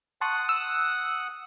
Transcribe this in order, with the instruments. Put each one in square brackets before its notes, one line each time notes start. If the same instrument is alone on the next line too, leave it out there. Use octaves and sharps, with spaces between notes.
[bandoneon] F#5 D#6 F#6 [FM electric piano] A5 C6 C#6
[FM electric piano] E6